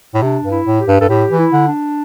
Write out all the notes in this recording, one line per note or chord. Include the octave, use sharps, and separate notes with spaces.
A2
C3 D4
G2
E4
A2
G4
G2
G2 A4
A2 G4
E3
E4
D3
D4